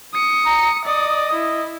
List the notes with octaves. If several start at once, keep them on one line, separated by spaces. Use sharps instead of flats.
D#6 C#7
A#5
D5 D#5 D#6
E4